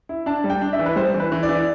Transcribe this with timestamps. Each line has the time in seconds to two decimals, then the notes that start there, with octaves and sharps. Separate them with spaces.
0.09 E4
0.26 D4 A5
0.44 G3
0.50 G5
0.61 D4
0.73 E5
0.79 E3
0.86 B4
0.96 G3 C5
1.14 E3
1.20 B4
1.32 E3
1.43 D5
1.49 E3